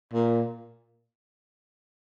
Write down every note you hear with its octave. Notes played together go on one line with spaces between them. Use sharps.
A#2